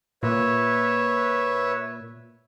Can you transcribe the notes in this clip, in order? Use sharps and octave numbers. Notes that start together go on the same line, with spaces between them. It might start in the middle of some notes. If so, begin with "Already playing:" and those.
A#2 B4 C#5 E5